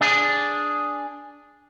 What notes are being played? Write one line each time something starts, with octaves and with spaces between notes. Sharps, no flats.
D4 G#4